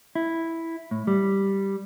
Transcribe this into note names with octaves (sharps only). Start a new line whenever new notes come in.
E4
A2
G3